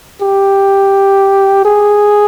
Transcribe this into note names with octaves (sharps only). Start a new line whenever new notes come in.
G4
G#4